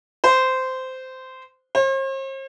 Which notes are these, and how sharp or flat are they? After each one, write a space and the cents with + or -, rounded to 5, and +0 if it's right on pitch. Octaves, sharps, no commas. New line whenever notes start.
C5 -15
C5 +45